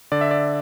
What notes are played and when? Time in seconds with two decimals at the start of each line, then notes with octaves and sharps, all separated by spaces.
0.12 D3 D5
0.21 E5
0.31 D5